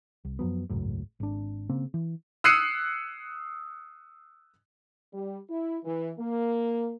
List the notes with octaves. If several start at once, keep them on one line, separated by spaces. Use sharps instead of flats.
C2
F#2 F3 F#3 B3
G#1 C#2 F#2 A2
G#1 D4
C#3 A#3 C4
E3
D#6 E6 F#6 C7 C#7 D#7
G3
E4
E3
A#3